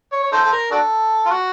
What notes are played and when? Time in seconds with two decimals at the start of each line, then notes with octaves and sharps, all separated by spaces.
0.12 C#5
0.23 C#5
0.32 D#4 A4 C5
0.44 A4
0.52 A#4
0.71 D4 F#4 A4
1.26 F4
1.30 F#4